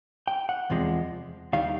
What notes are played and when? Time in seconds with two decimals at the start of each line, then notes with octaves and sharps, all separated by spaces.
0.27 G5
0.49 F#5
0.70 E2 C3 F3 G#3
1.53 D#2 D#3 G3 F5